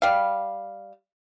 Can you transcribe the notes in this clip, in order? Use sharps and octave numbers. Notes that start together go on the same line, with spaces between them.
G3 F5